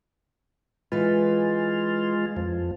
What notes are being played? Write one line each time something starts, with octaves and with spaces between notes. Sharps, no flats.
E3 G#3 F4 B4
F2 F3